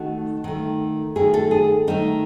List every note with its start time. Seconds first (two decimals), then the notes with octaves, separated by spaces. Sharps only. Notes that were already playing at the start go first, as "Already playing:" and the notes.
Already playing: D#3 A3 F#4
0.44 D#3 A3
1.16 D#3 A3 G#4
1.34 A4
1.51 G#4
1.87 D#3 A3 D#4